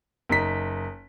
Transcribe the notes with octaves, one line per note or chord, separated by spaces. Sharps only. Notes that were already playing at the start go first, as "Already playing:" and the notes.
F#1 D#4 B6